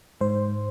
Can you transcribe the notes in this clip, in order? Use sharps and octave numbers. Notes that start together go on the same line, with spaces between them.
G#2 C5